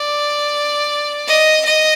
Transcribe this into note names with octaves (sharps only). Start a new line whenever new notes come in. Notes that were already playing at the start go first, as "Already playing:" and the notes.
Already playing: D5
D#5
D#5